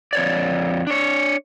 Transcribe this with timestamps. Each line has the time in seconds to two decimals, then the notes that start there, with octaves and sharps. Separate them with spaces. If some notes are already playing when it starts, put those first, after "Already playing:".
0.13 F2 C#5 D5
0.87 D4 C#5